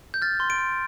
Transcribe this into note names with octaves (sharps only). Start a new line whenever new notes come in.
G6
F6 A6
C6
D7
C6